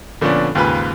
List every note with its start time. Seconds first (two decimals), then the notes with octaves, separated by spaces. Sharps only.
0.21 A#2 D3 F3 B3 C#4 D4
0.55 D#2 G#2 C#3 F4 B4